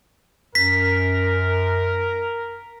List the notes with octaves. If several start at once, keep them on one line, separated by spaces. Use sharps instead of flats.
F#2 A#4 B6